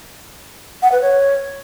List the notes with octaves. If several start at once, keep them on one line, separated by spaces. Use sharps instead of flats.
F#5
B4
C#5